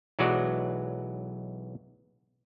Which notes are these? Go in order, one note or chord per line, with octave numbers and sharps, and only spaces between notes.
B1 E3 F#3 G#3 F#4 D5